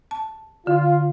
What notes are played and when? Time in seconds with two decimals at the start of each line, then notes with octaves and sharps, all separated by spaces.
0.11 A5
0.67 D3 F4